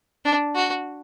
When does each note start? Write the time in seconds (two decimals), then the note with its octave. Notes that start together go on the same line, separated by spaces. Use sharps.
0.25 D4
0.54 F#4